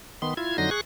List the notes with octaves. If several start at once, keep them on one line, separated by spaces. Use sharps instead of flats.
D#3 B3 C6
E4 F4 G#6
F2 D3 F#3 D#4 C6 A#6
G#4 C#6 F#6